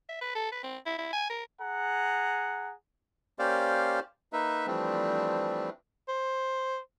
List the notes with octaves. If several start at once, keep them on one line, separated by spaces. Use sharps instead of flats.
E5
B4
A4
B4
C4
E4
E4
G#5
A#4
G#4 F#5 A#5
A#3 C#4 G4 C5 D5 F5
A#3 D#4 B4 E5
E3 F3 G3 A3 C4 D4
C5